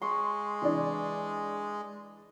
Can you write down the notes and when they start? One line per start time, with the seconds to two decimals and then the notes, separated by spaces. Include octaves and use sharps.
0.02 G#3 C6 C#6
0.62 E3 D4 D5